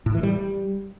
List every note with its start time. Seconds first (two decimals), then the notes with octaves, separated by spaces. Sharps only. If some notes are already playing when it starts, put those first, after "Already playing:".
0.06 A2
0.15 E3
0.23 G3